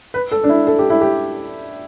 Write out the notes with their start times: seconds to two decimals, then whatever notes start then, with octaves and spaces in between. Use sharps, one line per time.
0.14 B4
0.32 A4
0.44 D4
0.49 E4
0.67 A4
0.79 G4
0.90 E4
1.01 G4